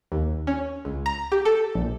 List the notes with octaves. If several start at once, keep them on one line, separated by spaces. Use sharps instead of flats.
D#2
C#4
C#2
A#5
G4
A4
A#1